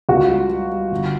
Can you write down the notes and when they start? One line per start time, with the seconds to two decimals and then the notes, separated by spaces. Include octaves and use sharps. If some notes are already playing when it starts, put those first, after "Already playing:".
0.09 C#2 F#4
0.30 G3
0.50 G3
0.71 G3
0.92 G1